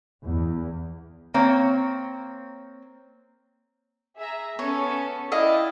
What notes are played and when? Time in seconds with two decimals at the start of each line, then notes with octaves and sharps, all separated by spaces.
0.24 E2
1.34 A#3 C4 C#5
4.17 G#4 E5 A#5
4.59 B3 C#4 A4 C#5
5.32 E4 D5 D#5 F5 G5 A6